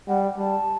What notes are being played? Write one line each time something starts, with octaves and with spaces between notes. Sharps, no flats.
G3 F#5
G3 A5